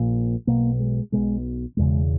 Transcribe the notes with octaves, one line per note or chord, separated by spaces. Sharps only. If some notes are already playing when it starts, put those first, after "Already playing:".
Already playing: A#1 A#2
B1 B2 A#3
G#3
B1 B2 G#3
E1 E2 C#3 G#3